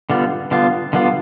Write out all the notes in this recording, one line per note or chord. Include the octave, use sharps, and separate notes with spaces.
D3 G3 B3 F4
D3 G3 B3 F4
D3 G3 B3 F4